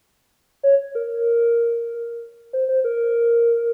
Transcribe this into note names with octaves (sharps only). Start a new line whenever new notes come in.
C#5
A#4
C5
C5
A#4